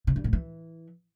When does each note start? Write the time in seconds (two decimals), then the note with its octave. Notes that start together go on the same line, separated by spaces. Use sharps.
0.07 C3
0.16 G2
0.24 A2
0.33 E3